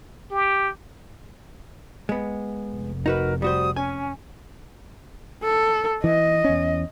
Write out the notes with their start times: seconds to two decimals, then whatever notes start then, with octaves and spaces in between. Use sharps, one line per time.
0.31 G4
2.09 G#3 B3
2.75 F1
3.06 D#4 F#4 A#4 B4
3.42 G3 F#4 C5 D#6
3.76 C#4 G#5
5.43 A4
6.04 E3 D#5
6.44 E2 C#4